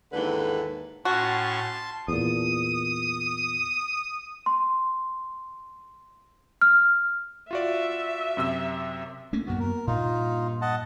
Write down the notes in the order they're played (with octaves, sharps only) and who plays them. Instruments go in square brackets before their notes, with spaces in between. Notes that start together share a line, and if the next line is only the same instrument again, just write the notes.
[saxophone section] D#2 G#2 D3 E3 A4 B4
[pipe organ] A2 C#4 C#6 [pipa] F#4 [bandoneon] A5 C6
[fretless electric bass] E2 A#2 [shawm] D#6
[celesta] C6
F6
[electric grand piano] F4 F#4 D5 [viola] E5
[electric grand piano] F#2 C3 E6
[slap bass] A3 A#3 C#4
[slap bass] F#2 A#3 B3 [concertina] F#4
[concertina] A#4
[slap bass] G2 A#2 [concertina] D#4 F4
[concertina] D#5 F#5 A5